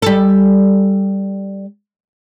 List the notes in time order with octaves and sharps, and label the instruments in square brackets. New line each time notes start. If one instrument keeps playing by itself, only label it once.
[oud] G3 A4